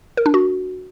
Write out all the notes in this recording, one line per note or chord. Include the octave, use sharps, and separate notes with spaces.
A#4
D4
F#4